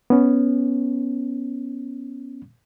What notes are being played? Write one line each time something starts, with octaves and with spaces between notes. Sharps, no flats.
B3 C#4